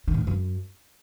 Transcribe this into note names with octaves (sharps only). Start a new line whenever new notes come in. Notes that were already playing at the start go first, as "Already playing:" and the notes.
D#3
A2
F2
F#2